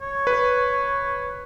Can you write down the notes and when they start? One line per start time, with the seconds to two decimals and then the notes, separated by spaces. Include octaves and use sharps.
0.02 C#5
0.27 B4